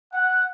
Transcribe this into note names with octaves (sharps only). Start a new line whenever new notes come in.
F#5